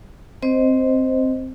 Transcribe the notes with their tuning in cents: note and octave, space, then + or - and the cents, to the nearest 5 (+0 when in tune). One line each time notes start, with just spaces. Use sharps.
C4 +0 C5 -5 D#5 +0